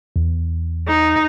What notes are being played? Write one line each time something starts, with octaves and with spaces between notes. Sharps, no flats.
E2
D#4